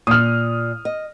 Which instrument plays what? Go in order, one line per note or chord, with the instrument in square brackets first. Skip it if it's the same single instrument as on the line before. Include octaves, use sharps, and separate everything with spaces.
[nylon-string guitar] A#2 [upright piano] D#6 F6
[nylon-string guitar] D#5